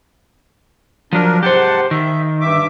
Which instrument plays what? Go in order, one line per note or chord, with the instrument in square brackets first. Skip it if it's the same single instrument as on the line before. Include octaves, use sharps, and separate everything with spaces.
[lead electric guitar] F3 F#3 [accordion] D4 A#4
[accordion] G#2 F#5 A5 [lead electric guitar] G4 C5
[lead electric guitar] D#3 [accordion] E5
[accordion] G2 E5 D6